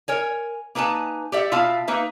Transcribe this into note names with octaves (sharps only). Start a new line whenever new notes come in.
A#4 C#5 G#5
A#3 D#4 B4 G#5 A5
G4 D5 E5 F#5
B2 F4 E5 F5 A5
A#3 D#4 B4 E5